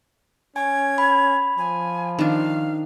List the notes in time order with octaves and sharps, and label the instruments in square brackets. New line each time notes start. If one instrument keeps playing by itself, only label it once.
[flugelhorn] C#4 [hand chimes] G#5 [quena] G#6
[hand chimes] B5
[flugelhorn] F3 [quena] G#5
[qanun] D#3 D4 [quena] F5